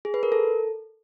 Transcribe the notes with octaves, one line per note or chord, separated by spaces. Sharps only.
G#4
B4
A#4
A4